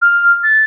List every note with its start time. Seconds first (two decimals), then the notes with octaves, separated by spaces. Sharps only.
0.02 F6
0.44 A6